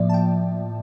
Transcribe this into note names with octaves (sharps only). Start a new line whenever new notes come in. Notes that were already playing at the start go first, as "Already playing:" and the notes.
Already playing: A2 F3 A#3 D5 E5
A5
G5